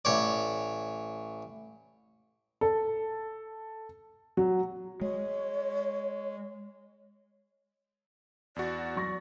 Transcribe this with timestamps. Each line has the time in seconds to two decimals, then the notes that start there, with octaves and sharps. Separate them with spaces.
0.05 A1 C#5 D5
2.61 A4
4.37 F#3
5.01 G#3 C#5
8.56 E2 F#4 D5
8.96 F#3 C#6 A#6